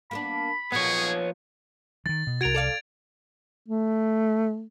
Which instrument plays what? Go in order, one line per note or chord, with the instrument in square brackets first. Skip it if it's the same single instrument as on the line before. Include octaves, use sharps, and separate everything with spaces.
[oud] A#3 B3 D4 [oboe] B5
[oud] A#2 F3 [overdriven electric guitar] B3 C#5 [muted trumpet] G#4
[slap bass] D#3 E3 [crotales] A6
[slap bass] B2
[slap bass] C2 C3 [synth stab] F#4 A#4 [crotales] G#6 D7 F7
[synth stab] A4 D5 F5
[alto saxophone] A3